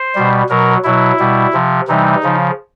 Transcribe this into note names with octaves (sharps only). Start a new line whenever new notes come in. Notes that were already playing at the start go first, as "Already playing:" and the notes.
Already playing: C5
B2 G3
B2 F#3 A#4
B2 F#3 E4
B2 G3
C3 F3
C3 E3 G3 D#4
C#3 F3